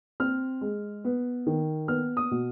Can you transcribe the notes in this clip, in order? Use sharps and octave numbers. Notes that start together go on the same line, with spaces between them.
C4 F6
G#3
B3
D#3
B3 F6
D#6
B2